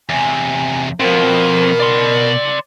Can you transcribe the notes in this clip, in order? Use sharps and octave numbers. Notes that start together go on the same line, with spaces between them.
E2 C3 G#5
B2 F3 C4 A#4
D5 C6